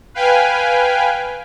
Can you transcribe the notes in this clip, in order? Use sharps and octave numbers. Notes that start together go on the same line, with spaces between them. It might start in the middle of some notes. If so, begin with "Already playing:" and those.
B4 F5 G5 G#5